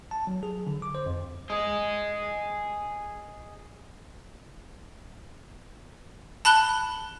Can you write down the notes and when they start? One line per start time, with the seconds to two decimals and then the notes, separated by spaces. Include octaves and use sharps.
0.11 A5
0.27 F#3
0.43 G#4
0.67 D3
0.82 D6
0.95 C5
1.06 F2
1.50 G#4 D#5
6.45 A5 B5 F#6 G7